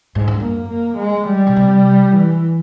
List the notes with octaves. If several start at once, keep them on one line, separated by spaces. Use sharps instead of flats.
G#2
G2
F#2 A#3
A#3
G#3
G3
B2
C3
E3